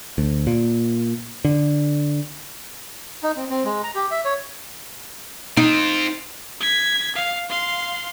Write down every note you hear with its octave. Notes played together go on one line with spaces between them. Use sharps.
D2
A#2
D3
D#4
C4
C4
G#3
A#5
G4
E5
C#5
C4 D#4 F4
G#6 B6
F5
F5 C6